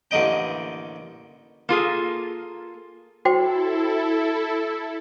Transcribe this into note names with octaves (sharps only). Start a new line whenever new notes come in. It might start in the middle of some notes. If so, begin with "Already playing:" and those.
A1 D3 A#3 D#5 G5
A#3 F4 G#4 A4
E4 F#4 A4 C5 G5